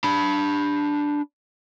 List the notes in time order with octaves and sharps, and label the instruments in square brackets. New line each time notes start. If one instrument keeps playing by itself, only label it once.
[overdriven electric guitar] D4 B5